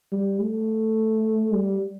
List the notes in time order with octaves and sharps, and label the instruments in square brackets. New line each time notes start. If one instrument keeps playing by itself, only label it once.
[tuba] G3
A3
G3